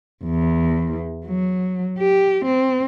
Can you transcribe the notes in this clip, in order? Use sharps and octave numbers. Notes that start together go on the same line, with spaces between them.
E2
F#3
G4
C4